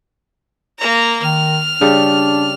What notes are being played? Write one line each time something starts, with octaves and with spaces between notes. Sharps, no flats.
A#3 A#5
D#3 F6
C#3 G3 D4